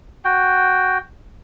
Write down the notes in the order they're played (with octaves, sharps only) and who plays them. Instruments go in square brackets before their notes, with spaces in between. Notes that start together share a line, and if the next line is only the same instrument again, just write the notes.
[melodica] F#4 G5